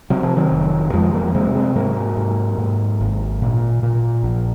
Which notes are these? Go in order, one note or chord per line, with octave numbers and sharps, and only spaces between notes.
C3 F#3
F3
D#3 F#3
F1
F2 F3 G#3
F#3 A#3
C3 G#3 C4
G#3 C4
G#2 F#3 A#3
G#2
G#2
G#1
A#2
A#2
A#1